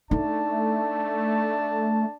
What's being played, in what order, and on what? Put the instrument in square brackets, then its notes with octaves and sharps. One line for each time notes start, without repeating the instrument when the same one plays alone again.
[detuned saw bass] A3 [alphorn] D4 [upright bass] D#4 [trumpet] A5